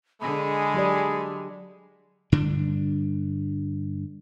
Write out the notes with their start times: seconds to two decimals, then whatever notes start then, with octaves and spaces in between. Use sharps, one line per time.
0.21 D3 G#3 G#4 B5
0.74 F#3 G4 D5
2.32 G2 D3 D4